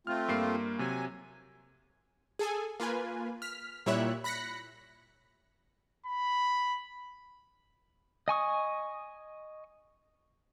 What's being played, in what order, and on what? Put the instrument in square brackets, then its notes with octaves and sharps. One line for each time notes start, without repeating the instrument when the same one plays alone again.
[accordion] A3 C4 F4 [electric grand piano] F6
[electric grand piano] G2 A#3 C7
[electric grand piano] C3 F#3 [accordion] G#5
[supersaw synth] G#4 A4 G#5
A#3 F4 B4 G#5
F6 B6
A#2 G3 E4 C#5 E5 F#6
B5 F#6 A#6 B6 C#7
[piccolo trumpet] B5
[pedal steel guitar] D#5 G#5 C#6 D#6